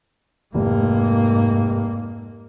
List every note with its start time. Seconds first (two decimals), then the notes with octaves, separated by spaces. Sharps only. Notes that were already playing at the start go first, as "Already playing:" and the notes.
0.54 F1 G#2 A#3